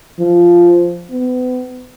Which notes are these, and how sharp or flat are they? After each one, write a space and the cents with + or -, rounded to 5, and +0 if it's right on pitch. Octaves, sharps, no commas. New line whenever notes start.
F3 -10
B3 +35